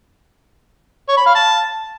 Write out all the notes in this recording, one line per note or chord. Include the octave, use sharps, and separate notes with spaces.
C#5
B5
F5
A5